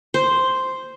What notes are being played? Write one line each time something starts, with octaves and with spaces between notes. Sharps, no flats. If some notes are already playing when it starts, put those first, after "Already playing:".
C5